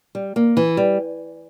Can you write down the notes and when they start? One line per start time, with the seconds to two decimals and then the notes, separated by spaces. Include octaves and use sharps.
0.15 G3
0.36 A#3
0.57 E3
0.77 G3